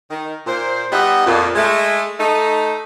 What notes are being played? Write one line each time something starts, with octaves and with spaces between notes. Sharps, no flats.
D#3
A#2 C5
G3 B3 D#4 D#5 E5 F#5
F2 A#2
G#3 A3
A3 D#4